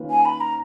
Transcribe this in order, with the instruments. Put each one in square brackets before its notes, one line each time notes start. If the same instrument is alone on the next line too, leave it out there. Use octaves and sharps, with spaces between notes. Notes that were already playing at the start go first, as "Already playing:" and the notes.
Already playing: [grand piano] D#3 A#3 C#4 F4 B4
[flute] G#5
B5
A#5